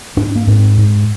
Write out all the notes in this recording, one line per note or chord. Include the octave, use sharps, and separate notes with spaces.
G#2 D4
A#3
G#2 C4
G#2